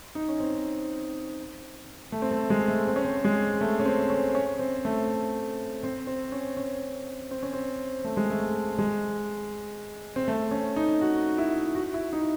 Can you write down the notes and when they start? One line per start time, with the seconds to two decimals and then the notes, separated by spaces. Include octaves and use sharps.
0.15 D#4
0.28 C#4
0.40 C4
2.12 A3
2.22 C4
2.31 A3
2.50 G#3
2.68 A3
2.88 C4
2.96 C#4
3.05 C4
3.24 G#3
3.61 A3
3.80 C#4
3.86 C4
4.10 C#4
4.35 C#4
4.59 C4
4.85 A3
5.83 C4
6.07 C4
6.32 C#4
6.57 C#4
7.31 C4
7.43 C#4
7.53 C4
8.04 A3
8.17 G#3
8.30 A3
8.78 G#3
10.16 C4
10.28 A3
10.51 C#4
10.76 D#4
11.01 F#4
11.38 E4
11.75 F#4
11.94 E4
12.13 D#4